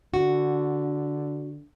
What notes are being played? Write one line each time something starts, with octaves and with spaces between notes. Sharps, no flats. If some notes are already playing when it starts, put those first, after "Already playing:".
D3 F#4